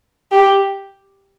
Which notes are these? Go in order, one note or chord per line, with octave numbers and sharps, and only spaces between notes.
G4